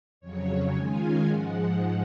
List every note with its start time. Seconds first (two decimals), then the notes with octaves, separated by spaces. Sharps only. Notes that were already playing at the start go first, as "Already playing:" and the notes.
0.20 F2 C#3 F#3 C#5
0.73 D#3 G#3 C#4 F4 G#5
1.26 G#2 F3 G#3 F#5